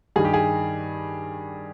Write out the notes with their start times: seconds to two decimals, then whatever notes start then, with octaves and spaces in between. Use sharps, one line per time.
0.16 G2 D#3 G#4
0.25 G4
0.34 G#4